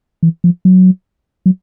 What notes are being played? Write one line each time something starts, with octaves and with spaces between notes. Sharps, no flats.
E3
F3
F#3
F#3